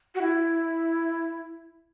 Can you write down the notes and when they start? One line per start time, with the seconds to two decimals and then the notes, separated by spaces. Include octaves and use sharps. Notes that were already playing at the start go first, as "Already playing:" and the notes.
0.15 F#4
0.21 E4